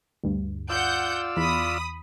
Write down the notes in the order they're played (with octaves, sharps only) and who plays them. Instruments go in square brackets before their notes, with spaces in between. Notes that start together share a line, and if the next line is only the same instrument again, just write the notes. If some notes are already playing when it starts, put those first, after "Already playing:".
[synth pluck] D2 G2
[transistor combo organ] F4 D5 E6 [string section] F#5 G6
[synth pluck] E2 [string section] B5 D#6